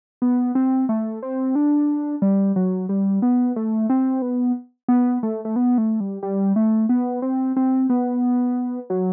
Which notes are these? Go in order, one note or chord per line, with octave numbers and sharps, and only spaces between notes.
B3
C4
A3
C4
D4
G3
F#3
G3
B3
A3
C4
B3
B3
A3
A3
B3
A3
G3
G3
A3
B3
C4
C4
B3
F#3